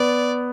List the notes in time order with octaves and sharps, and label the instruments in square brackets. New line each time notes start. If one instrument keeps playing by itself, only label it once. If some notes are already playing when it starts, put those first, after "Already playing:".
Already playing: [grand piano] B3 [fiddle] D5